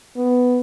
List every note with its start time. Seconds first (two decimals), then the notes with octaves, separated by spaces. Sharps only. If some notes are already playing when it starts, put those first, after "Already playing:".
0.16 B3